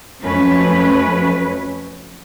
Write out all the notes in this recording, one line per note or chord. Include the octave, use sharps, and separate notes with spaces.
F2 F#3 A3 C#4 B4